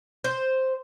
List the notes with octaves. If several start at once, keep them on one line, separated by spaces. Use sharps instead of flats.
C5